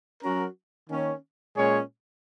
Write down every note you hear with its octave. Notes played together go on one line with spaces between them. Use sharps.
F#3 C#4 F#4 A#4
D#3 A#3 C#4
A#2 G#3 C#4 G#4 C#5